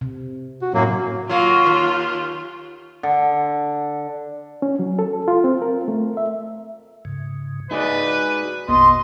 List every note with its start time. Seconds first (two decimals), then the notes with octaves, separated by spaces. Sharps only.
0.01 C3
0.62 F#4
0.74 F#2 A2 F#3 A#3
1.29 F#3 A#3 F4
1.66 D#2
3.03 D3
4.62 C#4
4.79 F#3
4.99 A4
5.28 F4
5.44 C4
5.62 A#4
5.88 A3
6.17 E5
7.05 G#2 C#3
7.71 G#3 D#4 F#4 G#4 B4 D5
8.68 A#1 F2 B2 D#5 C6